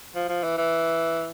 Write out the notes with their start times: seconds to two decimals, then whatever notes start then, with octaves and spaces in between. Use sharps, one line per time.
0.15 F3
0.29 F3
0.43 E3
0.58 E3